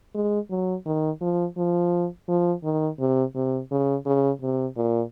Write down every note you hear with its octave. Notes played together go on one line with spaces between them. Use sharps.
G#3
F#3
D#3
F3
F3
F3
D#3
C3
C3
C#3
C#3
C3
A#2